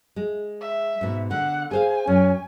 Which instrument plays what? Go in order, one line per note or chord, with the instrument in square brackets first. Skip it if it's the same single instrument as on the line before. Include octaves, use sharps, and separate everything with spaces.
[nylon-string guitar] G#3
[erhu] E5
[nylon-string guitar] G#2 B2
[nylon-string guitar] D3 [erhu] F#5
[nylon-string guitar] G#4 C5 F5 [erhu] G#5
[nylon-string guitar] F#2 [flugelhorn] C#4